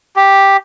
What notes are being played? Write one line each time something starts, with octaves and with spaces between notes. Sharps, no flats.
G4